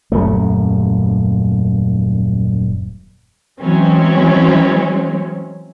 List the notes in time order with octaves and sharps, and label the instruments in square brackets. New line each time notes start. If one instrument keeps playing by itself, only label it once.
[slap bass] D#1 F#2 A3
[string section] E3 F#3 G#3 C4 C#4